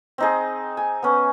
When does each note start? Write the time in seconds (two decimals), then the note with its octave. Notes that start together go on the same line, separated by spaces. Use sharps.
0.18 C4 D#4 G#4
0.77 G#5
1.03 B3 C#4